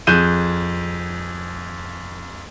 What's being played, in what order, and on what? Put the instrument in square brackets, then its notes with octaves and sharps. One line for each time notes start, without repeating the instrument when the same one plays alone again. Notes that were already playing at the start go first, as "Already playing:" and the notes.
[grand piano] F2 G#4 F#6 G6 D#7 E7